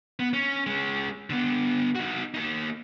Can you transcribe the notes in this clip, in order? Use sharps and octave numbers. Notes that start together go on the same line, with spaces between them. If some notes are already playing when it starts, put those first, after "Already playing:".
B3
C#4
G#3 C#4
D3 B3
D#4 F#4
A#3 D#4